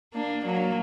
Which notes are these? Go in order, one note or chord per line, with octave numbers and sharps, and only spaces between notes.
A#3 D4
F#3 A#3